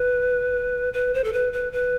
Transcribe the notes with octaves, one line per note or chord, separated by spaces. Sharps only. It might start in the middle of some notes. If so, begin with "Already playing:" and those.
Already playing: B4
B4
C5
A4
B4
B4
B4